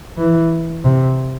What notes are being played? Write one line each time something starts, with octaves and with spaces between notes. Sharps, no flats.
E3
C3